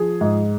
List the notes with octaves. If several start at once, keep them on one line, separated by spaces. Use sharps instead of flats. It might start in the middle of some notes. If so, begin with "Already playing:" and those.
Already playing: F3 G#4
G#2